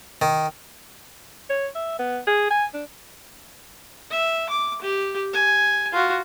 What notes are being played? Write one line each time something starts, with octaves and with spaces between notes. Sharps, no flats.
D#3
C#5
E5
B3
G#4
G#5
D4
E5
D6
G4
G#5
F4 F#4